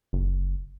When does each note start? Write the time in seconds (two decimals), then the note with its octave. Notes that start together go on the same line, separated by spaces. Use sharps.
0.13 F#1